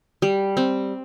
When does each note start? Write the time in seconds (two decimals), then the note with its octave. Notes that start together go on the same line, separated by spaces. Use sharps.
0.22 G3
0.57 C4